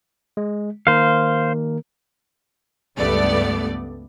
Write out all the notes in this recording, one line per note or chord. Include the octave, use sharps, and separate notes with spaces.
G#3
D#3 A#3 A#4 C5 F5
C#2 G2 A3 B3 D5